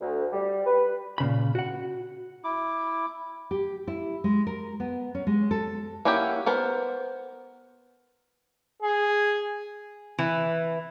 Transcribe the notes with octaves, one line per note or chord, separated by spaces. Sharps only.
D2
G3
B4
A#2 C#3 B5
F#4 F#5
E4 D6
G4
E4
G#3
A#4
B3
C#4
G#3
A4
A#3 C#4 E4 F#4 G4
B3 A#4 C5
G#4
E3